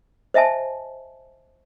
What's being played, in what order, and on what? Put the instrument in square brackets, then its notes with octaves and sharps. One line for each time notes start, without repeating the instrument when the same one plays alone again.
[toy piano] C5 D#5 E5 G#5 A5